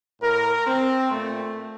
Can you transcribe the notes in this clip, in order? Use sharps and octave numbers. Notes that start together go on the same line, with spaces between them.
A2 A#4
C4
A#2 A3